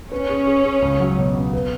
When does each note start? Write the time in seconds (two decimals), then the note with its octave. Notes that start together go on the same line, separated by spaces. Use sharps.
0.12 C#4 B4
0.30 G#4
0.47 G#4
0.65 G#4
0.82 C#2
1.00 F#3
1.18 B2
1.35 B3
1.53 B4